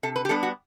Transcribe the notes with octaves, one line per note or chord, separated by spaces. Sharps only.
C3 A4
B4
G4
G3 B3 D4 A4
F#4